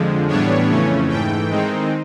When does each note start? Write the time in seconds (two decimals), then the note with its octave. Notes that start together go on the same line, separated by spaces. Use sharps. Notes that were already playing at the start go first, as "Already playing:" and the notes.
Already playing: F2 D3 F3 G#3
0.28 A2 E3 G3 B3 D4 C#5
0.69 F2 C#3 E3 A3 C#4
1.09 G#2 E3 A3 G5
1.50 D#3 G#3 C4 D#4